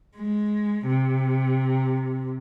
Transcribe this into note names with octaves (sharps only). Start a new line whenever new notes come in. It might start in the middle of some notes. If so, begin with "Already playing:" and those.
G#3
C3